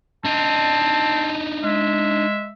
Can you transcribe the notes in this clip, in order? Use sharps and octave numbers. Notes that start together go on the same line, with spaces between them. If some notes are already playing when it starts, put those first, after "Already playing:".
C4 D4 D#4 A5
G#3 E5